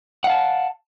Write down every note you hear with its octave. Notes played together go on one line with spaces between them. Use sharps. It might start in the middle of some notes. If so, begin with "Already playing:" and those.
F5 F#5 A5